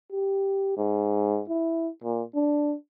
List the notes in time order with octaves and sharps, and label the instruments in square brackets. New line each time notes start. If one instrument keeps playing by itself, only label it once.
[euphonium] G4
G#2
E4
A#2
D4